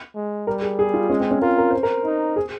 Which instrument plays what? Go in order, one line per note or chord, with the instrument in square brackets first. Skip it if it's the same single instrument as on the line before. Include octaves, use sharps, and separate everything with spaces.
[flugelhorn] G#3
[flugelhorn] G3 [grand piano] A#4
[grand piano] G#4
G#4
F4
[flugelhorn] G#3 [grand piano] C#4
[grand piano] C4
C#4
[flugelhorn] F4 [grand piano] A#4
[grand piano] A#4
C5
A#4
[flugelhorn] D#4
[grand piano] G#4